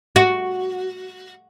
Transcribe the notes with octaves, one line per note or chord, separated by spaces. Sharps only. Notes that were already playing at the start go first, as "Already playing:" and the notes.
F#4